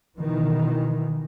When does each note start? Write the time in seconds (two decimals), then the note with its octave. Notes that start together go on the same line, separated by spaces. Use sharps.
0.18 B2 D#3 E3